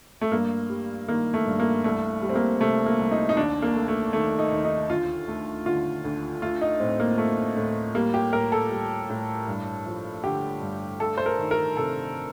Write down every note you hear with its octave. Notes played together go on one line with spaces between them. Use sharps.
A3
G2 A#3
G3
D#3 A#3
A3
G2
A#3
C2 A3
G3
C4
A#3
C3 A3
A#3
C2
D#4
D#4
D#2 D4
A#3
A3
A3
D#3 A3
D#4
D#2
D#4
D2 F4
A3
D3 F4
D2
A3 F4
D#4
A2 C4
A#3
A3
A2
G3 A#3
G4
A2 A#4
A4
G3
A2
G2
F3
D3 G4
G2
A3 A4
C5
A#4
D#3
A#4
C3 A4